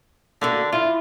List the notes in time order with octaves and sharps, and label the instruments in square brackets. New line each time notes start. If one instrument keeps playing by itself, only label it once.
[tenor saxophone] D3 [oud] A#3 F#4 A4
[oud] E4 [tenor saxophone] F4